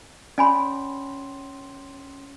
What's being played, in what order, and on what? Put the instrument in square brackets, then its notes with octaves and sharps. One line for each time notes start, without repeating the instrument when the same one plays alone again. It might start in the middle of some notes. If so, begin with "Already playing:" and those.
[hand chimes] C#4 C6 [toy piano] D5 G#5 B5